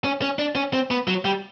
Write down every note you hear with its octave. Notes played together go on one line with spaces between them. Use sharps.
C#4
C#4
D4
C#4
C4
B3
F#3
G3